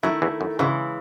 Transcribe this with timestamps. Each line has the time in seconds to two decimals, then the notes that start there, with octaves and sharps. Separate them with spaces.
0.03 F#2 D#3 F#3 A3 E4
0.22 E2 E3
0.41 F#2
0.59 G#1 G#2 C#3 E3 G#3